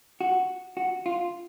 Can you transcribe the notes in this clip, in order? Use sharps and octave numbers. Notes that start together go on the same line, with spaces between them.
F#4
F#4
F4